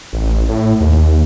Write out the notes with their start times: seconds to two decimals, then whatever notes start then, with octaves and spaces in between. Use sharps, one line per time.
0.13 A1
0.49 A2
0.80 D#2